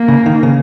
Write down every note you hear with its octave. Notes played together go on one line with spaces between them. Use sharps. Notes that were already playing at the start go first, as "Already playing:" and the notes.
Already playing: A#3
C#3
D#3
C#3